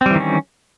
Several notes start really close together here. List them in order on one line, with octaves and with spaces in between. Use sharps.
C4 G3 E3 D#3 C#4